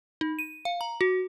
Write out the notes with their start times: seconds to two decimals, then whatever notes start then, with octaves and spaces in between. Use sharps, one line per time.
0.21 D#4
0.39 D#7
0.65 F5
0.81 A#5
1.01 F#4